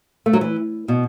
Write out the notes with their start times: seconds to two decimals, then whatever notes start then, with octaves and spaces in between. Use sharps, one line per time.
0.26 A3
0.33 F#3
0.41 E3
0.88 B2